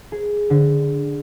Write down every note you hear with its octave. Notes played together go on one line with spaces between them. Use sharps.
G#4
D3